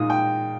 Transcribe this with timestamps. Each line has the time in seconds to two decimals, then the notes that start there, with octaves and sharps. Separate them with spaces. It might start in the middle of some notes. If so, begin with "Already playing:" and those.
Already playing: A#2 G#3 D#4 D#6
0.10 G5